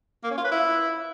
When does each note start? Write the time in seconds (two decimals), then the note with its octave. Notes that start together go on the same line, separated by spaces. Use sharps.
0.24 A#3
0.31 C#4
0.37 F4
0.44 B4
0.51 E4